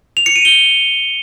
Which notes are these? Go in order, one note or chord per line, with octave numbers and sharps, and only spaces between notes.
F7
C#7
D#7
G7